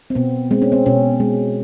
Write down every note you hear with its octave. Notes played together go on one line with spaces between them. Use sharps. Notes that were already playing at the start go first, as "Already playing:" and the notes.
C4
B2 B3
G#3 C4
C#4
C4
B2 C#4
G#3